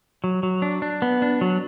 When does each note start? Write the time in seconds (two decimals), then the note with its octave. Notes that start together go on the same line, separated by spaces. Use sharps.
0.24 F#3
0.43 F#3
0.62 D4
0.82 D4
1.02 B3
1.22 D4
1.41 F#3